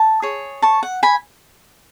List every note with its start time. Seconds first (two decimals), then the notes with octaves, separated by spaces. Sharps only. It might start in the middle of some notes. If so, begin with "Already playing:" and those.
Already playing: A5
0.22 G#4 C#5
0.62 A5 C#6
0.83 F#5
1.03 G#5 B5